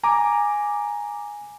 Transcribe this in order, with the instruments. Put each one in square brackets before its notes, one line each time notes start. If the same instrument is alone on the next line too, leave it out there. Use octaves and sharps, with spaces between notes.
[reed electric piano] G#5 [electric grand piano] A#5 D6